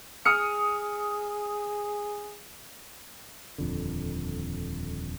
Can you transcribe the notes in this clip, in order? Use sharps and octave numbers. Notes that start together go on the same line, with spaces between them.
G#4 D#6 F6 C#7
D#1 F2 D3